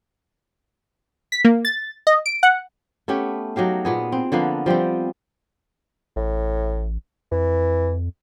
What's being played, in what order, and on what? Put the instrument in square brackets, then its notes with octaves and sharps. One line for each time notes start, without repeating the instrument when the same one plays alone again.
[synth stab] B6
A#3
A6
D#5
D7
F#5
[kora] A3 B3 C#4 G4
F#3 D#4 G4 F5
A#2 B3 G#4
C4
D3 F3 A#3 B3
F3 G3 B3 C4
[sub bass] A1 [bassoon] A2
[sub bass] F2 [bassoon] E3